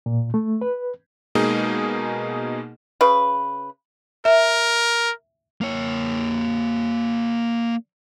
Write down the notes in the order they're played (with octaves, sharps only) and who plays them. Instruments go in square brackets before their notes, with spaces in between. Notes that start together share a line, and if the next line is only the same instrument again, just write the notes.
[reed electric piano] A#2
A3
B4
[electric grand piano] B2 G#3 A#3 D#4 G#4
[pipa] C#3 B4
[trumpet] A#4 [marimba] E5
[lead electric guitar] A#3 C#5